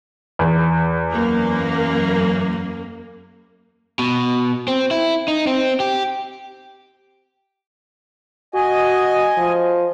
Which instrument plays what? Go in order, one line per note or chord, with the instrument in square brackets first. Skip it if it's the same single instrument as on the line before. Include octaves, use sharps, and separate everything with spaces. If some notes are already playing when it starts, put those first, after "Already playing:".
[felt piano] E2
[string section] F#2 A#3
[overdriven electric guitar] B2
C4
E4
D#4
C4
G4
[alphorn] F#4 [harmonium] D#5 G#5
[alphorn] F3